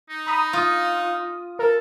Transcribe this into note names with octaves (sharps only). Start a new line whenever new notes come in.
D#4
A#5 B5 D#6
F4 D#6
A4 A#4